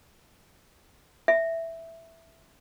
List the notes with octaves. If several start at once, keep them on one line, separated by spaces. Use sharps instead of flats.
E5